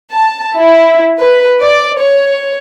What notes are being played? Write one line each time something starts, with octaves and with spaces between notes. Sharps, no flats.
A5
E4
B4
D5
C#5